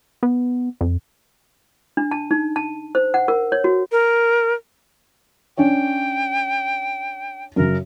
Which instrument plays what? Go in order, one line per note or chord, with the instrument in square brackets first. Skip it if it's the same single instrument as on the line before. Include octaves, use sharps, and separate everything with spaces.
[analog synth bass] B3
F2
[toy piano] D4
A5
D#4
A5
C5
F#5
A#4
C#5
F#4
[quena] A#4
[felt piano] C#4 D4 C#5 [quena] G5
[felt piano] F#2 C#3 [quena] A#4